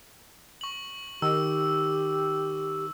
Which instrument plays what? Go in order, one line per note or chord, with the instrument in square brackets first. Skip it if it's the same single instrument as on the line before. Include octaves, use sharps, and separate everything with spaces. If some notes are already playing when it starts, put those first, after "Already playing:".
[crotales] C#6 F#7
[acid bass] D#3 [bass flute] G4 [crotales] E6